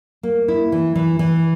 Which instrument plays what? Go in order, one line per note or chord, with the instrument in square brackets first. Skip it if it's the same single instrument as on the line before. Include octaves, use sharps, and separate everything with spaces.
[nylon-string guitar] A#3
E4
E3
E3
E3